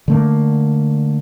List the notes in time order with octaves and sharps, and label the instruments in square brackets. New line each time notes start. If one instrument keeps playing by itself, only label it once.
[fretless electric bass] D3 A3 A#3